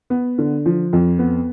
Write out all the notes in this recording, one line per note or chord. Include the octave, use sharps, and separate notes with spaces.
B3
D3
F3
F2
B3